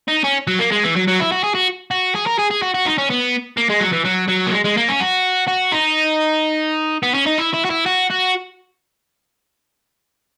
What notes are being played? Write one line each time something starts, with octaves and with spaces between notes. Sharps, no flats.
D#4
C#4
F#3
A#3
G#3
E3
F#3
F#3
E4
F#4
G#4
F#4
F#4
G#4
A#4
G#4
G#4
F#4
F#4
D#4
C#4
B3
A#3
G#3
F#3
E3
F#3
F#3
A#3
G#3
G#3
A#3
C#4
F#4
F#4
D#4
B3
C#4
D#4
E4
E4
F#4
E4
F#4
F#4